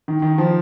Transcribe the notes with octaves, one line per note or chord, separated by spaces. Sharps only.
D#3
D#3
F3